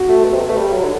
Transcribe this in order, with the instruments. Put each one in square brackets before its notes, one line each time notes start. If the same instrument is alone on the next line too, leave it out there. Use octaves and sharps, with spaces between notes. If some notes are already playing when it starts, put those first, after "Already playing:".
Already playing: [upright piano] F#4
[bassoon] A3
B2
C3
B2
A3
G3
F#3
D3